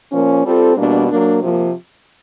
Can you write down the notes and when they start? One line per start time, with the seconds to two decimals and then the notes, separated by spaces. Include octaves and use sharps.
0.12 A#2 F3 A#3 C#4
0.44 G3 C4 F4 A4
0.76 E2 B2 G3 A#3 D4
1.08 F#3 A#3 D4
1.41 C3 F3 A#3